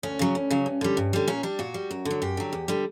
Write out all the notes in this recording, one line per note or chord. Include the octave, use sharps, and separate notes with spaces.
D2 C#4
C#3 F#3
D2
C#3 F#3
G2
D3 G3
G2
D3 G3
A#2 C#4
G3 D4
A#2 F#4
G3
F#2
D3
F#3
F#2 G4
D3 F#3
E2
D3 G3